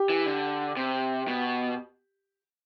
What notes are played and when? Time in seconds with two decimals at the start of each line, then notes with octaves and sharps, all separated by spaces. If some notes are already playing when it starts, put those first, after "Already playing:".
Already playing: G4
0.10 E3
0.26 D3
0.77 C3
1.27 B2